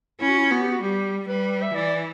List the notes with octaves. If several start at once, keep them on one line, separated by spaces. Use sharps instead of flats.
C#4 E4
F#4
E4
B3 F#4
G4
F#4
G3 G4
G3 B4
E5
E3 D5